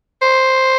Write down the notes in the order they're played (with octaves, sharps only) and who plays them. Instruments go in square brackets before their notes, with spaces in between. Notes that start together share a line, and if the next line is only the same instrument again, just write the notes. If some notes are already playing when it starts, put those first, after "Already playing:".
[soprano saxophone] C5